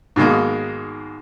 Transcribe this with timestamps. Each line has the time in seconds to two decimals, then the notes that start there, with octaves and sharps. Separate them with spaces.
0.16 G#2 B2 D#3 G#3 A#3